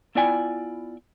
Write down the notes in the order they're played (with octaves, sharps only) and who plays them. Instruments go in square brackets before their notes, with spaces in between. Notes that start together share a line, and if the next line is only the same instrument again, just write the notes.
[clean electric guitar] B3 E4 F4 D5 G5 G#5